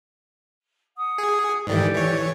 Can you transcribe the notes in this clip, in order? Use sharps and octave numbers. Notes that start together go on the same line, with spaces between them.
F#5 D#6
G#4
G#2 D#3 E3 G4 A4 D5
E3 C#5